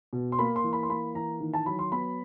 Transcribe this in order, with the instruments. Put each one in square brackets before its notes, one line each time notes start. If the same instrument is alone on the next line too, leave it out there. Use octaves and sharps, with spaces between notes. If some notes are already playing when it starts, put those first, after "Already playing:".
[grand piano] B2
C6
A#3 B5
C6
E3
B5
C6
A#3 B5
E3 A#5
D#3
A5
F#3 B5
C6
B3 B5